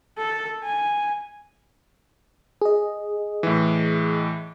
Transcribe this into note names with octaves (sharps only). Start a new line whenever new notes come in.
A4
G#5
G#4 D#5
A2 E3